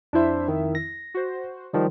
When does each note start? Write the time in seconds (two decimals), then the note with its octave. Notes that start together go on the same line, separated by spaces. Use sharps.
0.13 F2 D4 E4 C5 E5
0.48 D#3
0.75 A#6
1.14 F#4 C5
1.73 D#3 F3 G3